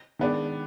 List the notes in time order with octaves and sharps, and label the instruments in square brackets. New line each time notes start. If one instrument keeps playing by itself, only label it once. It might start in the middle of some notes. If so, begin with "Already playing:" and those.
[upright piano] D#3 G#3 B3 D4